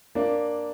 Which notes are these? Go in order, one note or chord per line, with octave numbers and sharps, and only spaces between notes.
A#3 D4